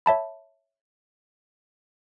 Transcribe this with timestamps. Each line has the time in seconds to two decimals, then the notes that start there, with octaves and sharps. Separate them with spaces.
0.06 C#5 E5 A5 B5